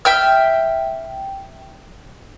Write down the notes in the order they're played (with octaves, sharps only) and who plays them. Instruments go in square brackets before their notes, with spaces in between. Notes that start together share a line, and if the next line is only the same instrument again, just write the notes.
[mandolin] E5 G5 F6